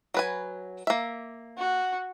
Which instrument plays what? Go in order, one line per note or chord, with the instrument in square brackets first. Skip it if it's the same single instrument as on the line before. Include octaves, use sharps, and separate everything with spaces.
[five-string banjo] F#3 B4 G#5
A#3 E5
[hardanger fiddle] F#4